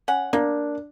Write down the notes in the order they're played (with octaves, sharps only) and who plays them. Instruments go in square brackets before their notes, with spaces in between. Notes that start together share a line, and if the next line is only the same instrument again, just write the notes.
[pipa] C#4 F#5
[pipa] A#3 [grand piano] D4